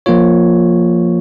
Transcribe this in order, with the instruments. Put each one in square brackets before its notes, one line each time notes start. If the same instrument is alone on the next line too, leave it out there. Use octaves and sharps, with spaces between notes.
[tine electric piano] F3 A#3 F4 C#5